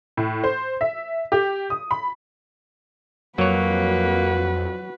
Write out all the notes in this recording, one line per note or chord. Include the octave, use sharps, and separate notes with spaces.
A2
C5
E5
G4
D#6
B5
F2 F#3 A#3 F#4 B4 C#5